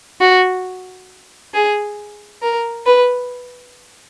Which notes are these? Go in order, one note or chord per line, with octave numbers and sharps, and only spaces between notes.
F#4
G#4
A#4
B4